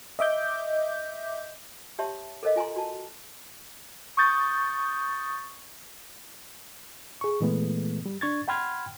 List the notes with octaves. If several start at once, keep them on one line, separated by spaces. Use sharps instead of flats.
D#5 E5 D6 G6
G4 C#5 E5 A5 C6
A4 A#4 C5 D#5 F5
F4 G#5 A#5 C6
F#4 A5
C#6 D#6 G6 A6
G#4 C#6
A#2 E3 G#3 A3 B3
G3
D4 C#6 G#6 A6
F#5 G5 B5 C6 F6 G#6